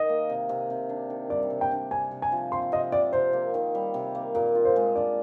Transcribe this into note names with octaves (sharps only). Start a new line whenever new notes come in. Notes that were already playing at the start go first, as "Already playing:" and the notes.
Already playing: D#3 D#5
A#3
C3
C3
C3
D4
D#3
G3 D5
C3
G5
D4
C3 G#5
C3
G#5
F3
C4 C6
C3 D#5
C3 D5
C3 C5
A#3
D#3
G3
C3
A#3
A#2 A#4
F4
C5
G#3
D4 D5